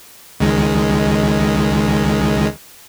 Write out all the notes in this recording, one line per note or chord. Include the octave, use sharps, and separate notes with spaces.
C#2 D#3 G#3